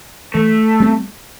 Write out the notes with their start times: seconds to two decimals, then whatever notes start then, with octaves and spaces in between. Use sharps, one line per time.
0.34 E3 A3
0.80 G3 C4